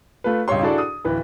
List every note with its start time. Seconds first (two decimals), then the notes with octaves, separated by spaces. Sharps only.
0.24 A3 F4 B4
0.48 C#2 G2 G4 C#5 C6
0.63 D4 E4 F#4 G#4 A4 D5
0.78 D#6
1.05 D1 E3 B4